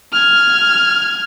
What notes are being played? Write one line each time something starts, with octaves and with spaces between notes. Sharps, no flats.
F6 G#6